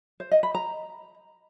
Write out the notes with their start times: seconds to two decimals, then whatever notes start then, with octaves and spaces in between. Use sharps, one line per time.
0.20 C5
0.31 D#5
0.43 B5
0.55 A#5